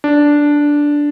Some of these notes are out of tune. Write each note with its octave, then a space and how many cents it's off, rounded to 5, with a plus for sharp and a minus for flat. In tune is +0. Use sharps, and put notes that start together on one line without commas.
D4 -5